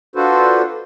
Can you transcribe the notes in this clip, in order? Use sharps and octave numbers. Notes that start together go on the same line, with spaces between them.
D4 F4 F#4 A4 B4 C5